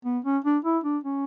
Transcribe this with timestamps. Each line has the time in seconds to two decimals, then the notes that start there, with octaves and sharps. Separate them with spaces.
0.05 B3
0.25 C#4
0.45 D4
0.65 E4
0.84 D4
1.04 C#4